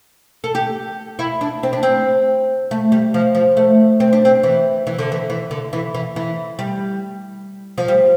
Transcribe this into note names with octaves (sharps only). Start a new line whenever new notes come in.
A4
G4
E4
D4
C4
D4
C4
A3
G3
F3
F3
A3
C4
D4
C4
E3
E3
D3
E3
E3
D3
E3
E3
E3
G3
F3
G3